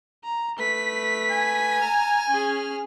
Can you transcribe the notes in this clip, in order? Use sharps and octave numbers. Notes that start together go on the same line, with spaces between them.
A#5
A3 B4 B6
G#5
A#5 F6
C#4 G#4